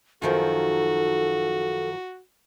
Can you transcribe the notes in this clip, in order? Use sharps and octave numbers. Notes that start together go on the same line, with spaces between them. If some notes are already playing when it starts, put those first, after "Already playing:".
F#2 D#3 F3 F#4 A4